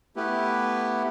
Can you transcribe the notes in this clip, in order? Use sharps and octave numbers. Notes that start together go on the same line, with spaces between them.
A3 B3 E4 G4 B4